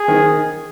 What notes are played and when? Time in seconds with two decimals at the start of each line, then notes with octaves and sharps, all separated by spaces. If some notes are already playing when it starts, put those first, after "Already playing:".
Already playing: G#4
0.08 D#3